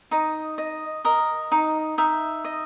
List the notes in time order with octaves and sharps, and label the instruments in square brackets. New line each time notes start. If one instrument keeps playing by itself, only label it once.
[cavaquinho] D#4 D#5
D#5
A#4 D#5
D#4
D#4 E5
D#5